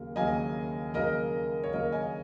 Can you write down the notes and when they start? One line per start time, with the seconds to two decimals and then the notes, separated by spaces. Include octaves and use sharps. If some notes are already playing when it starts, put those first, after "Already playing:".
Already playing: D#2 C#3 F#3 A#3
0.16 D#2 C#3 F#3 A#3 D#5 G#5
0.94 D#2 C#3 F#3 A#3 A#4 D#5
1.64 C#5
1.73 D#2 C#3 F#3 A#3 A#4 D#5
1.92 D#5 G#5